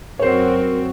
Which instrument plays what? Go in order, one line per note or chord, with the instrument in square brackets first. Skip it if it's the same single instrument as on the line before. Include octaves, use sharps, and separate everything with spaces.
[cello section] F#2 C4 F#4 [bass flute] A#4 [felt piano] C5 C#5